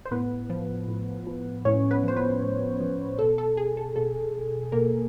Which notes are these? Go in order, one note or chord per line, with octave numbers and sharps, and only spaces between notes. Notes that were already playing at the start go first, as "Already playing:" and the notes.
C5
A2 B3 B4
F3
A2
F3
A2 C#4 C#5
B3 B4
F3 C5
B3 B4
A2
F3
B2 A4
A4
G#4
A4
B2 A4
B2 A#3 A#4